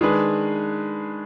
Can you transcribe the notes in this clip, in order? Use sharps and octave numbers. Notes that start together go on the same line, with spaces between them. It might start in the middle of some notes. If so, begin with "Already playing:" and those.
D#3 G#3 D4 G#4 B4